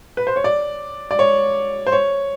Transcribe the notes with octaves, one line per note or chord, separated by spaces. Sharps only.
B4
C5
C#5
D5
D5
C#5
C5
C#5